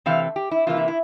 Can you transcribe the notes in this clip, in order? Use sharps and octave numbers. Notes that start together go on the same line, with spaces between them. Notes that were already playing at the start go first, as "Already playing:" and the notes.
C3 E3 A3 C4 F5
G4
E4
C3 E3 A#3 F4
E4
E4